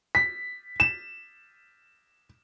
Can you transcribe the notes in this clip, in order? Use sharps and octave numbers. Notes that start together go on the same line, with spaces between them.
B6
E7